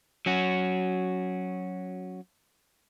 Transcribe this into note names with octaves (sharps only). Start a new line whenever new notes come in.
F#3 C#4 F#4